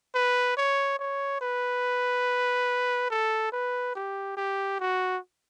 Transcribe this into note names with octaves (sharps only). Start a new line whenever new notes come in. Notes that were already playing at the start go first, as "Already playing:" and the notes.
B4
C#5
C#5
B4
A4
B4
G4
G4
F#4